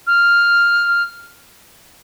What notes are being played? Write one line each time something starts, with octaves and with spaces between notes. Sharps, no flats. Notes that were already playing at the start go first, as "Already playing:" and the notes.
F6